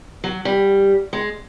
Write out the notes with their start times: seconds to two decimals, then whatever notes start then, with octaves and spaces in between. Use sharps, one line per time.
0.24 F#3
0.45 G3
1.13 G#3